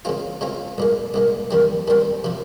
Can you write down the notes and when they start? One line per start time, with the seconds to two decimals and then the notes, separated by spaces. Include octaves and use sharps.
0.05 C#3 G#3 C4 F4
0.41 C#3 G#3 C4 F4
0.78 C2 A#2 G#3
1.14 C2 A#2 G#3
1.51 D#2 D#3 G3 C4
1.88 D#2 D#3 G3 C4
2.24 C3 F3